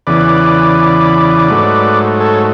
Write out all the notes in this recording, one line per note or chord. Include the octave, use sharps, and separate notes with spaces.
E2 C#3 E3 B4 D5
G#2 F#3 A3
A4 C#5